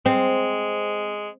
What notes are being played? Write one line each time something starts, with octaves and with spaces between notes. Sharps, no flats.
G#3 C4